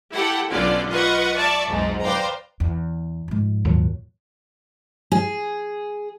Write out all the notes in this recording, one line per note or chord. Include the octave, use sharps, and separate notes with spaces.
E4 G4 A4 F#5 G5
B1 D3 B3 C#4 F4 D5
F4 B4 D#5 F#5 C#6
D5 E5 A5 C#6
B1 F2 G#2
B4 C5 D5 F5 G5 A#5
E2
G#2 F3
D#2 A#2 F#3
G#4